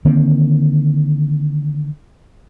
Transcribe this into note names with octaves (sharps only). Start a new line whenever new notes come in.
D3 D#3 A#3 C4